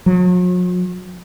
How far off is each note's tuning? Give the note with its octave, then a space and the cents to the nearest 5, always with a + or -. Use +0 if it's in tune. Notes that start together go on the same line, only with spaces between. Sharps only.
F#3 -45